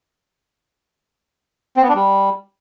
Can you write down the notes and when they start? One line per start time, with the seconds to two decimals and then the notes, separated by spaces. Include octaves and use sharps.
1.77 C4
1.83 B3
1.89 D4
1.95 G3